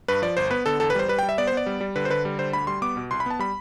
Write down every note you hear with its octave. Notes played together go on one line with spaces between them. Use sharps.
G2 B4
F3 D5
G1 C5
B3 B4
D3 A4
E2 A4
B4
G3 C5
G3 B4
G5
G3
E5
B3 D5
C5
B3
D5
G3
G3
D3 B4
C5
D3 B4
G3
D3 C5
D2 B5
G3 C6
B3 D6
B2
C2 C6
B5
B3 A5
G3 B5